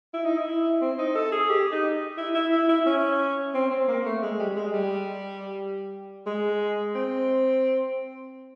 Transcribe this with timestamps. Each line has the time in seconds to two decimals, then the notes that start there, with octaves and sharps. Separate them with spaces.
0.14 E4
0.25 D#4
0.38 E4
0.81 C4
0.99 D#4
1.15 A4
1.32 G#4
1.49 G4
1.72 D#4
2.18 E4
2.35 E4
2.52 E4
2.69 E4
2.86 C#4
3.54 C4
3.71 C4
3.88 A#3
4.05 A3
4.23 G#3
4.40 G3
4.56 G#3
4.74 G3
6.26 G#3
6.95 C4